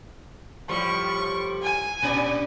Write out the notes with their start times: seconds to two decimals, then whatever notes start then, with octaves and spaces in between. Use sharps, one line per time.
0.69 A2 F3 G3 C#6
1.62 G#5
2.02 A#2 C#4 D5